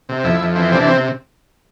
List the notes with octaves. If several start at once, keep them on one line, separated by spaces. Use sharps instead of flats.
C3
F2 E4
F2
E3 C4
C3 D4
C4